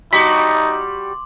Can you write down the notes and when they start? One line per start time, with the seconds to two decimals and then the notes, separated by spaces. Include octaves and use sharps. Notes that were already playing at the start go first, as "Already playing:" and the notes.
0.13 G3 D#4 F#4 C6 D6 B6 F#7